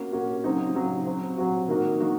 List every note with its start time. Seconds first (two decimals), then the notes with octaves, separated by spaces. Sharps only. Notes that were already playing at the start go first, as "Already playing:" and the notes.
Already playing: A#3 C#4 F#4
0.12 A#3 C#4 F#4
0.44 C#3 F#3 C4 D#4
0.74 C#3 F#3 C4 D#4
1.06 F#3 C4 F#4
1.38 F#3 C4 F#4
1.69 D#3 A#3 D#4 F#4 A#4
1.99 D#3 A#3 D#4 F#4 A#4